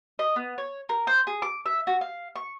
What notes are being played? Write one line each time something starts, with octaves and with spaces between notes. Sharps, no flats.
D#5
B3
C#5
A#4
C5
G#4
D6
E5
F#4
F5
C#6